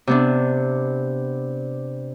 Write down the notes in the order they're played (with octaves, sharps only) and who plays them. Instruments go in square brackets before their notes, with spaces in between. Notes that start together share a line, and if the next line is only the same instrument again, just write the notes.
[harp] C3 B3 D4